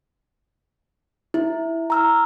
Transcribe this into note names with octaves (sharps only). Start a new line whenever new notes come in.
E4
A#5 E6 F6